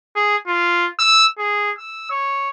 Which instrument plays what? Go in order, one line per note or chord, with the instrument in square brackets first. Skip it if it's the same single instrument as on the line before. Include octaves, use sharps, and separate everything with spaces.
[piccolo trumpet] G#4
F4
E6
G#4
E6
C#5